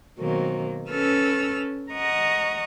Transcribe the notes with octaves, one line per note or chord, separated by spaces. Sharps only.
B2 D#3 F#3 A#3 C4
C#4 A4 B4 E6 F6
D#5 F#5 A#5 C#6 D#6